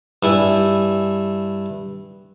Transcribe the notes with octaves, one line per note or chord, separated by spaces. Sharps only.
G2 E4 G#5